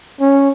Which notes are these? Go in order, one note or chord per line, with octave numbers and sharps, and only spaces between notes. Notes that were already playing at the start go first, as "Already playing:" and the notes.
C#4